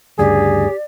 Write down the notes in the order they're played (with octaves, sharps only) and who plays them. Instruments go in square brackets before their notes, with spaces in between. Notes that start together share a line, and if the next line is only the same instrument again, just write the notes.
[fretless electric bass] D2 G2 C#3 [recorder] G4 [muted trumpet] G#4 [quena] D5